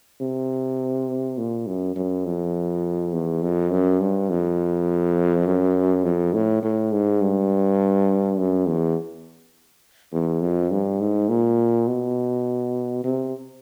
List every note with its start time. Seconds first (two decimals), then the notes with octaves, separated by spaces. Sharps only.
0.21 C3
1.38 A#2
1.67 F#2
1.96 F#2
2.25 F2
3.13 E2
3.42 F2
3.71 F#2
4.00 G2
4.30 F2
5.47 F#2
6.04 F2
6.34 A2
6.63 A2
6.92 G#2
7.21 G2
8.38 F#2
8.66 E2
10.12 E2
10.41 F2
10.71 G2
11.00 G#2
11.29 A#2
11.88 B2
13.04 C3